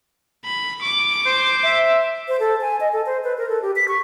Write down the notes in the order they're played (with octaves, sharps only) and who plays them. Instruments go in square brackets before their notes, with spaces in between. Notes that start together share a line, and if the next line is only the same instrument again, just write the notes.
[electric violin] B5
[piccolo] C#6 [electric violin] D6
[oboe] C5
[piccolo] E5
[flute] C5
A4
G#5
D#5
A4
C5
B4
A#4
A4
G4
B6
C#6